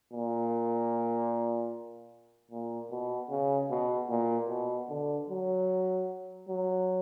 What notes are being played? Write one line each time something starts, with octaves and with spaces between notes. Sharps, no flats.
A#2
A#2
B2
C#3
B2
A#2
B2
D3
F#3
F#3